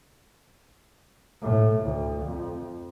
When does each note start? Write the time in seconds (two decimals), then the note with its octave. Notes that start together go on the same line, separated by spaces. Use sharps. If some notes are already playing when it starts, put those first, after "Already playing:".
1.41 A2
1.84 D2
2.25 F2